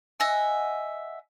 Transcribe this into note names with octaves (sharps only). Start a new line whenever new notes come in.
D#5 E5 F#5 G#5